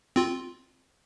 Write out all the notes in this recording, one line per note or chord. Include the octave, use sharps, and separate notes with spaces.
C4 F4